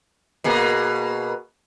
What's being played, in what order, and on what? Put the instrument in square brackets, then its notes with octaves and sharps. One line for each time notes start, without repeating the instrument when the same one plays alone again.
[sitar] B2 A#3 G#4